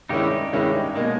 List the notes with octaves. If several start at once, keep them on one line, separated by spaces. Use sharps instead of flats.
G2 D#3 G#3 C#4 D#4 E4 G4
G2 D#3 G#3 C#4 E4
B2 G#3 A#3 D#4